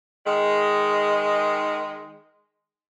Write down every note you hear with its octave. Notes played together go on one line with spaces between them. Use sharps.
D#3 G#3